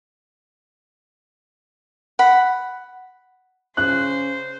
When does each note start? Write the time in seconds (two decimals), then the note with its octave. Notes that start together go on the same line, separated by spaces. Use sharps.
2.19 F#5 B5
3.77 C#3 C5 F#6